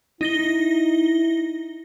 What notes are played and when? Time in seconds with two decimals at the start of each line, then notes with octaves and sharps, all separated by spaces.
0.21 D#4 E4 A#6 G7